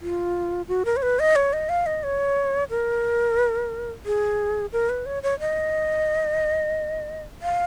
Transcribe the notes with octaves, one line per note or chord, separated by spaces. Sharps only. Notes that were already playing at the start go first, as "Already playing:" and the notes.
F4
F#4
A#4
C#5
B4
D#5
C#5
D#5
F5
D#5
C#5
A#4
G#4
A#4
B4
C#5
C#5
D#5
F5